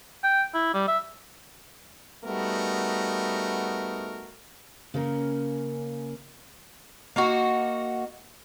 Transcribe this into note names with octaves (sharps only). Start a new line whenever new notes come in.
G5
E4
G3
E5
G3 A3 B3 D#4 F#4 A#4
C#3 A#3 C#4 A#4
A#3 D#4 F#4